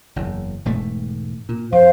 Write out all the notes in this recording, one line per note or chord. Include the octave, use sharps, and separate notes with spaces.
F#1 E2
E1 G#2 A3
A#2
F2 C5 F5